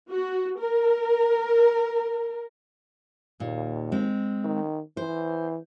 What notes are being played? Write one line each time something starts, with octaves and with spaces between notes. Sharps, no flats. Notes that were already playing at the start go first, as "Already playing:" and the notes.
F#4
A#4
D#2 A#2
G#3 C4
D#3
E3 C5